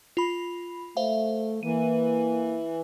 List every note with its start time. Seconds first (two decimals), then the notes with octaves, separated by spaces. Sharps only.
0.17 F4 B5
0.97 A3 C5 E5 F5
1.63 E3 A#3 D#7